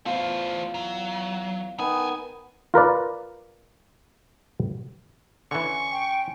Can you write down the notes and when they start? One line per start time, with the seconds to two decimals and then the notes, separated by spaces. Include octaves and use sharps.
0.06 E2 A3 F4 C5
0.74 F#3
1.79 D#2 D#3 B3 G#5
2.74 F4 A#4 B4 D5
5.51 D3 E3 C#4 C6 C#6
5.92 G5